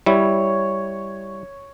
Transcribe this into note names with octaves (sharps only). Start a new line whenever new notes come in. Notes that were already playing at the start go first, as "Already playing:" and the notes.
G3 E4 C#5